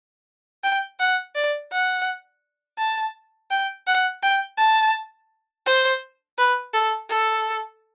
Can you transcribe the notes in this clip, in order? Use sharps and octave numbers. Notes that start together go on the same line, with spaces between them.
G5
F#5
D5
F#5
A5
G5
F#5
G5
A5
C5
B4
A4
A4